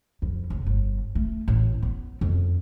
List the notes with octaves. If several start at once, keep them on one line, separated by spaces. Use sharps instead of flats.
F2
F1
G1
A3
A1
B3
F2